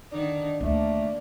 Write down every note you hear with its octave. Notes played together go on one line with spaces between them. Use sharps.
D3 D#3 D4 D#4
D2 A3 A#3 D4